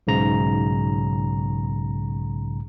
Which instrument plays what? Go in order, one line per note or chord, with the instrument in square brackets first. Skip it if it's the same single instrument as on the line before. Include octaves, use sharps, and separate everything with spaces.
[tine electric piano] B1 G#2 C#3 A#5